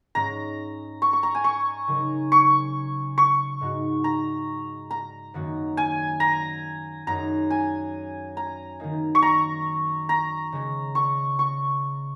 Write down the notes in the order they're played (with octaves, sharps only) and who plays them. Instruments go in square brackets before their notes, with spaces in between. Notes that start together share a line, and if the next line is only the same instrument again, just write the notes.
[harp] G#2 G#3 C#4 [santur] A#5
[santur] C#6
C#6
A#5
G#5
C#6
[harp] C#3 F#3 D#4 A#4
[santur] C#6
C#6
[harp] G#2 G#3 D#4 F#4
[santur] A#5
A#5
[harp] F#2 D#3 A#3 D#4 F#4
[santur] G#5
A#5
[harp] F#2 F#3 D#4 G#4 [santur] A#5
[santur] G#5
A#5
[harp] D#3 A#3 D#4
[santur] C#6
A#5
A#5
[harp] C#3 G#3 C#4
[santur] C#6
C#6